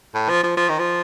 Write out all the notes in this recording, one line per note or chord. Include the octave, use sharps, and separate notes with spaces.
A2
F3
F3
F3
D#3
F3